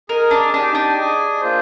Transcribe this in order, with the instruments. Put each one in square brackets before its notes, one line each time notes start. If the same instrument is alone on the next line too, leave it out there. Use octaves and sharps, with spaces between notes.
[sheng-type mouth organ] G#4 D#5 G#5 [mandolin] A#4
[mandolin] D4
[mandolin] D4 [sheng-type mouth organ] D#4 G4 D5 G#5
[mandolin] D4
[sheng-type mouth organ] G#4 D#5 G#5
A#3 F4 C5